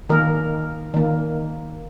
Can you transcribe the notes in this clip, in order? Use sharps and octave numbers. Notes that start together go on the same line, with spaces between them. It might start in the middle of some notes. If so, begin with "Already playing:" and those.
D#3 A#3 A#4
D#3 A#3